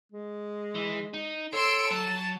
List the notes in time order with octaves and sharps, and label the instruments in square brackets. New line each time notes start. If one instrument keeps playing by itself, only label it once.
[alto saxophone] G#3
[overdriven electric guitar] E3
D#4
[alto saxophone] A4 [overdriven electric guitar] C#5 [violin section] C6 E6 D7
[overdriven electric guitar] F#3 [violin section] A5